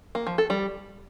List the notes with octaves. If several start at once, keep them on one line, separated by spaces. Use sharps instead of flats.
A#3
F3
A4
G3